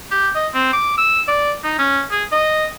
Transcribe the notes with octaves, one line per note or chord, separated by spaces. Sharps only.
G4
D#5
C4
D6
E6
D5
D#4
C#4
G#4
D#5